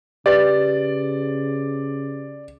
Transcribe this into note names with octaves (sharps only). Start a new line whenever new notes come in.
C#3 G4 B4 D5 A6